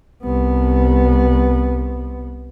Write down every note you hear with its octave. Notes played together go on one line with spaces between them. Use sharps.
C2 B3